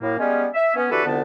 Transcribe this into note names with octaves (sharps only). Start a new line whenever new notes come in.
F#2 A2 A#3
G3 G#3 B3 C#4
E5
B3 C#4
D3 E3 F#4 G4 A4 B4
C2 F2 D3 B3 D4 A5